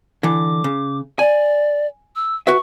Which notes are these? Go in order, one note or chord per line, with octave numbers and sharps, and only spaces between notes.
D3 E3 D6
C#3
D5 G#5
E6
F#4 B4 E5 C#6